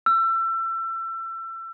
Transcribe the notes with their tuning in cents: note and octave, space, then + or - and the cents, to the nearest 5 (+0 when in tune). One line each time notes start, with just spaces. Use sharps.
E6 +30